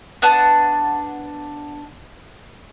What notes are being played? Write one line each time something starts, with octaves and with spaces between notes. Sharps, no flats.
B3 D4 F#5 A5